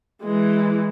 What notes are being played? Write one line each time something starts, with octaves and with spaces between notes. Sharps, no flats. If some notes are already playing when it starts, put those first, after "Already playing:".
E3 G#3